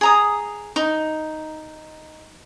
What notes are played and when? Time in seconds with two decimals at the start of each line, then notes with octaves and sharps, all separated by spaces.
0.01 G#4 A#5 D#6
0.76 D#4